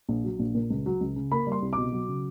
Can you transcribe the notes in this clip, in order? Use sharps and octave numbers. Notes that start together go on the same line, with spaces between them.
A#1
F#3
A#1
A#2
C#2
F#3
C#2
C#3
A#3 B5
G3
C6
C2
B2 D6
F#3
C#3